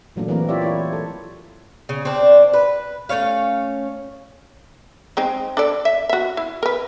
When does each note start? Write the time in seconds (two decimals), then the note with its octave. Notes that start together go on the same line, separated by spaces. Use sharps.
0.16 A#2 E3 F#3 A3 A#3 D4
0.28 E3 F#3 A#3 C4 A#4
0.48 E4 F4 G4 C#5 D5 E5
0.62 E4 F4 C#5
0.93 A4
1.89 C#3
2.05 C4 D4
2.53 B4
3.09 A3 C#4 C#5 F5
5.17 G#3 C4 D#4
5.57 D4 A4 D5
5.85 E5
6.09 F#4 E5
6.37 E4
6.63 A#4 B4